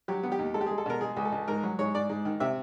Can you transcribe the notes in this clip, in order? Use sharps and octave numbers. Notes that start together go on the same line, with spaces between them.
F#3 G4
B3
G4
D#2
G#3 A4
G4
G#3 G#4
A4
B2 A#4
G#3 G#4
C#2
A4
C#2
G#2 A#4
F#3
G#2 C#5
G#2 D5
G#2
D#3
C3 E5